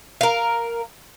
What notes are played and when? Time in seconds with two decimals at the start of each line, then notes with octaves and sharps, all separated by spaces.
0.21 A#4 F5